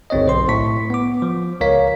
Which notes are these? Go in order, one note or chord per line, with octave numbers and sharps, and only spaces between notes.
G1 C#2 C4 C#5 D#5
B1 C5 C6
A2 C#6 B6
B3 D6
F3
C#2 A#4 C#5 F5 B6